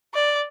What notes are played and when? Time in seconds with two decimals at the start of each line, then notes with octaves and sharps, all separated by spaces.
0.14 D5